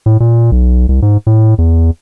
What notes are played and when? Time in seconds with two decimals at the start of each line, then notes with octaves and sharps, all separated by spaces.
0.06 A2
0.20 A#2
0.52 B1
0.89 C2
1.02 G#2
1.27 A2
1.58 E2